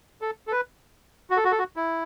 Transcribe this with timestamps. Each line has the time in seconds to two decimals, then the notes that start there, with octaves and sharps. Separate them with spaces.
0.21 A4
0.47 A4
0.52 B4
1.30 F#4
1.37 A4
1.45 F#4
1.52 A4
1.59 F#4
1.76 E4